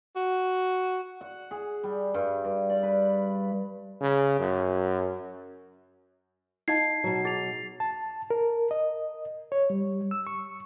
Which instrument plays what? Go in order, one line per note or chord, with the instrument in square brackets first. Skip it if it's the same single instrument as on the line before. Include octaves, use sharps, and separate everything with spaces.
[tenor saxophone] F#4
[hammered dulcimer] F#5
G#4
G3
G2
G2
D5
B4
[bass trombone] C#3
F#2
[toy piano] D#4 D#5 F5 [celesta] A5 G#6 [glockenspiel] C7
[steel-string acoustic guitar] B2 F#3
[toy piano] G#4 [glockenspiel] A6 F7
[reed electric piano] A5
A#4
D#5
C#5
G3
E6
C#6